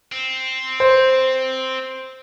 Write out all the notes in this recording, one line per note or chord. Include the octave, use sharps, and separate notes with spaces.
C4
C5